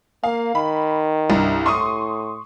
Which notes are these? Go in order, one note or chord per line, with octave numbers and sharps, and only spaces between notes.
A#3 F5
D#3 B5
C2 G2
A2 C6 C#6 D#6